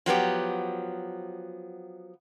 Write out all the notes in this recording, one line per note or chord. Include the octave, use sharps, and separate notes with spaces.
F3 F#3 B3 G4